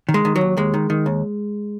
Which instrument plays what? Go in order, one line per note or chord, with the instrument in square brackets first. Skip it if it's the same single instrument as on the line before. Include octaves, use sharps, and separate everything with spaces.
[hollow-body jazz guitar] D#3
G#3
D#3
F#3
D#2
D#2 G#3
D#3
D#3
D#2